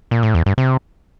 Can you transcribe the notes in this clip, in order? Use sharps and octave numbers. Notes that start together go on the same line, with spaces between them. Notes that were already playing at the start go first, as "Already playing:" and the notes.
A#2
A2
E2
G2
C3